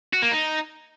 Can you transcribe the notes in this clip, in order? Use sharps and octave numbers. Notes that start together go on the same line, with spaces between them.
F#4
A#3
D#4